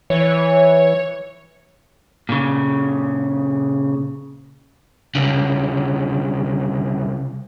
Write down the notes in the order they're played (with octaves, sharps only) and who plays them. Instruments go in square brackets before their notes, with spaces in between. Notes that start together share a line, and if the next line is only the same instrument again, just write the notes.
[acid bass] E3 [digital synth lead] C#5
[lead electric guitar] A#2 C#3
[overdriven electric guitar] C2 C#3